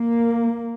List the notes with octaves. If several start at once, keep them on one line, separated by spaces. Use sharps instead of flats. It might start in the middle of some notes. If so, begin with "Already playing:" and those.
Already playing: A#3